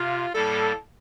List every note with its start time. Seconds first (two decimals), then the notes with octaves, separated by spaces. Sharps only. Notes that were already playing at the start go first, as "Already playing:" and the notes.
Already playing: C3 F4
0.34 A2 G3 A#3 A4